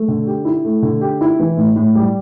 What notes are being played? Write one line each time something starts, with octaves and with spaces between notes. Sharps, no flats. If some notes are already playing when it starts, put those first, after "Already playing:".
Already playing: A3
D3
G4
E4
A3
D3
G4
E4
E3
A2
A2
G3